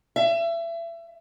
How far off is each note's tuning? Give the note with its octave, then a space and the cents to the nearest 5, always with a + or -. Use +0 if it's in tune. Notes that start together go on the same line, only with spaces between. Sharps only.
E5 +30